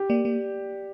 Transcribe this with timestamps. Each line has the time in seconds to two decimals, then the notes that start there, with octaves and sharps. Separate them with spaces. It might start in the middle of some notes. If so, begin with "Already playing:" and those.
Already playing: G4
0.09 A#3 D5
0.25 A#3